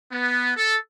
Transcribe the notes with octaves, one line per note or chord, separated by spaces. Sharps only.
B3
A4